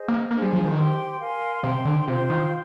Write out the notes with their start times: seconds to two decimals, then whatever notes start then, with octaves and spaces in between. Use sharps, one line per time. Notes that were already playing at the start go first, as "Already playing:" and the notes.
Already playing: G#4 C5 D#5
0.08 A#3
0.31 A#3 D4 G#4 C5
0.42 G3
0.53 F3
0.64 D#3
0.76 G4 C5 G5 C6
1.19 A#4 F5 G#5 C6
1.63 C3 C5 G5 C6
1.85 D3
2.07 C3 F4 C5 G5 C6
2.30 D#3